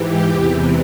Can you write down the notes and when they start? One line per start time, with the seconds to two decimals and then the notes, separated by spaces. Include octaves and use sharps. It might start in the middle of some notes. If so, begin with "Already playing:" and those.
Already playing: G#2 E3 G4
0.29 E2 C3 E3